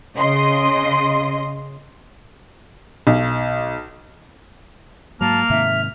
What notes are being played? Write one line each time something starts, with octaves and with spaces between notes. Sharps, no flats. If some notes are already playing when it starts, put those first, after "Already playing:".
C#3 D#5 C6
B1
G#2 F#3 A#3 A5 F6
G#2 C3 D#3 E5